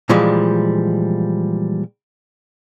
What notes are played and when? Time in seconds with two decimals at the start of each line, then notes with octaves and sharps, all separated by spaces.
0.09 A#2 E3 F3 G3 G#3